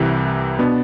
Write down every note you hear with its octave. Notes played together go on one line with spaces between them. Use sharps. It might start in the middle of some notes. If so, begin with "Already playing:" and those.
Already playing: C2 C3 E3
B2 B3 D4